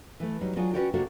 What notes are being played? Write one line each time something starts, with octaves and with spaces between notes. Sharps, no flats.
E3 A3
F#3 G3 D#4
F#3 D4 F4 F#4 G#4
C#4 F#4 B4 C#5 D5 G5
C3 A#3 D4 F#4 A4